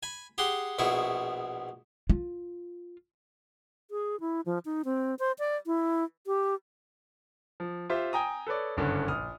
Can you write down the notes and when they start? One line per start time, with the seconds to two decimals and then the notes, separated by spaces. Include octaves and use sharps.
0.03 G#5 B5
0.38 G4 G#4 F#5 C6
0.79 A#1 B2 E4 G#4 C#6
2.10 F4
3.91 G#4
4.20 E4
4.46 F3
4.65 D#4
4.85 C4
5.19 C5
5.39 D5
5.66 E4
6.27 G4
7.60 F3
7.90 F4 G4 C5 E5
8.13 G5 G#5 A#5 D#6
8.47 A4 B4 C#5 D5
8.77 F#1 G2 D3 C#4
9.08 A#1 D#6 F6